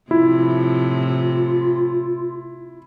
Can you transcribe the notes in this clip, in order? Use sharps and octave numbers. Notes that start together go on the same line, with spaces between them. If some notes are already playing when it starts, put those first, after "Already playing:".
A2 C3 F3 E4 F4